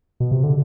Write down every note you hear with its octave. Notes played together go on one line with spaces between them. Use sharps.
B2
C3
D3